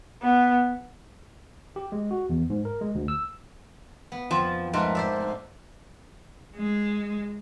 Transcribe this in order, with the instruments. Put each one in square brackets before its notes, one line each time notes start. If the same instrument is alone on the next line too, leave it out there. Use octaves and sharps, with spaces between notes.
[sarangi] B3
[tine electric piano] G4
G#3
F#4
E2
G#2
A#4
G#3
D2
E6
[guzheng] B3
[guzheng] F2 [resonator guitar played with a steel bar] F3
[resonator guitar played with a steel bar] G#2 [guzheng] A3 A#4 B4
[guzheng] C5 D5 E5
[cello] G#3